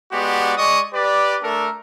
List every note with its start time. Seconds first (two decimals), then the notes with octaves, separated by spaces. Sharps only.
0.12 G#3 B3 F#4 G4 D5
0.58 G#3 D5 D#5 C#6 D#6
0.94 G4 B4 D5
1.43 A3 D4 A4 A#4